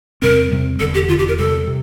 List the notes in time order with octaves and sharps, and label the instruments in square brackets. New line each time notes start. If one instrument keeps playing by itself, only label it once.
[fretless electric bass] E2 C3 G3 C4 [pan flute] A#4
[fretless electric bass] E2 C3 G3 C4
[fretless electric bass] E1 E2 D3 [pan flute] A4
[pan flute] G4
[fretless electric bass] E1 E2 D3 [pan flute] F4
[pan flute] G4
A#4
[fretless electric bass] E2 C3 G3 [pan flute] A4
[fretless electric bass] C3